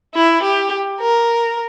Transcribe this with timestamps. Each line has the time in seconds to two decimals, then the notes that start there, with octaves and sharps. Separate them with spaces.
0.15 E4
0.43 G4
1.00 A#4